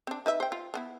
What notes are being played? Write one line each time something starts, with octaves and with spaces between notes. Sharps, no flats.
C4 D4
D#4 B4 E5
C5 G5
F4
F3 B3 E4